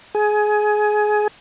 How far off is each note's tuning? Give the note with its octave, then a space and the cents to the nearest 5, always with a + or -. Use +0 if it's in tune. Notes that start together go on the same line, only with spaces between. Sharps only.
G#4 +20